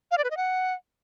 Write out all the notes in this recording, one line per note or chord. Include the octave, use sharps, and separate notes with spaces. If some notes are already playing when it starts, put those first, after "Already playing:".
F5
D5
B4
D#5
F#5